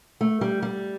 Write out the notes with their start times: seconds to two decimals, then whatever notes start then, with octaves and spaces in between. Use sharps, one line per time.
0.21 A3
0.41 G3
0.62 G3